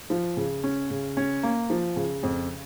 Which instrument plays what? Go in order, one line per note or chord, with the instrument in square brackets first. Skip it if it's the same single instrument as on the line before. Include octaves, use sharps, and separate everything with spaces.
[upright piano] F3
C#3
C#4
C#3
C#4
A#3
F3
C#3
F2